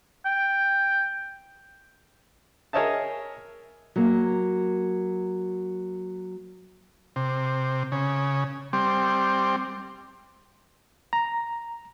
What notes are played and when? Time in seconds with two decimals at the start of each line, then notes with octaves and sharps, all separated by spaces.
0.26 G5
2.73 G#4 A#4 C#5 D#5 E5 A5
3.96 F#3 A#3
7.16 C3
7.92 C#3
8.73 G3 C4
11.13 A#5